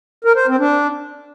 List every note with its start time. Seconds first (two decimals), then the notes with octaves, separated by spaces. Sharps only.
0.24 A#4
0.36 C5
0.48 C4
0.59 D4